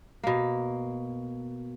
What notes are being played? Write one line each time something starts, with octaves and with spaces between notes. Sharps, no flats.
B2 A#3